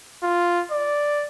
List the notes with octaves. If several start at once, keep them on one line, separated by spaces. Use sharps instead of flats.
F4
D5